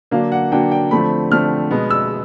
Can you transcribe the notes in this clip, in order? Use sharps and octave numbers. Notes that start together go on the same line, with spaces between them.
D3 F#3 A#3 D4 F5
F#5
D3 F#3 A#3 D4 G5
G5
D3 F3 A3 C4 B5
D3 F3 A3 C4 F6
B2 G#3 B3
E6